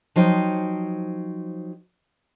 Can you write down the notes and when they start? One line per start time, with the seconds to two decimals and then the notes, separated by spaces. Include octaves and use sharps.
0.16 F3 F#3 D#4 C5 G5